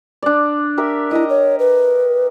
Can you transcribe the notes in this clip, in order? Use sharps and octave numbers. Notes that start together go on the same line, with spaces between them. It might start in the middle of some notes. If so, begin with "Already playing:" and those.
D4 D5
G4 A#4 E5
E4 D#5 A#5
C#5
B4